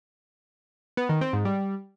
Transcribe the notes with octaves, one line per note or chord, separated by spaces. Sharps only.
B3
D#3
C4
G#2
G3